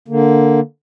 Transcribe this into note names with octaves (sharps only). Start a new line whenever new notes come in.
D3 A#3